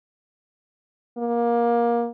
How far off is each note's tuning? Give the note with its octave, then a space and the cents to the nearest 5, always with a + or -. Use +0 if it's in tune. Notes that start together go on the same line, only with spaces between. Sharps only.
A#3 +20